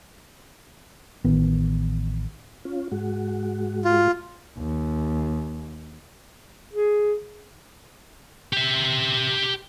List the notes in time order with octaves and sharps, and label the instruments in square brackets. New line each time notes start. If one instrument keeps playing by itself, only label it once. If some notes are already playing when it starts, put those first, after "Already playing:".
[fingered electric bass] A1 D#3 B3
[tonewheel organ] C#4 F4
G#2 G#3 F#4
[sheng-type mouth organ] F4
[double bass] D#2
[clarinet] G#4
[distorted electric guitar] G4 E5